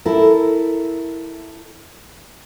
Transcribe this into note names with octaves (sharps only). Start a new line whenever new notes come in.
E4 A4 A#4